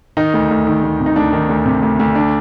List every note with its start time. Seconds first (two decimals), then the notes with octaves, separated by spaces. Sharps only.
0.17 D#3 D#4
0.34 D2
0.51 D2
0.67 D#3
0.84 D2
1.00 C3
1.06 D#4
1.16 D2 D4
1.33 D#3
1.49 D2
1.66 C3
1.83 D2
1.99 D2
2.15 D4